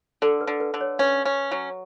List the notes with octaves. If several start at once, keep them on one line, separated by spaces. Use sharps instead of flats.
D3 A4
B4
D3
B4
D3
C#5
C#4 B4
C#4
F#3